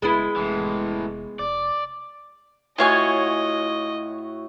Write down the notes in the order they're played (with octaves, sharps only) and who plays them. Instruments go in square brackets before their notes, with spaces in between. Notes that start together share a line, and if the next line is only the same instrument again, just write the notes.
[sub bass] F#1 [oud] G#3 B3 E4
[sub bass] F1 [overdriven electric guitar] A2 E3
[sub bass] F1 [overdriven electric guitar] D5
[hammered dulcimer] A2 F#4 F#5 [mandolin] F4 C#5 G#5 [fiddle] D#5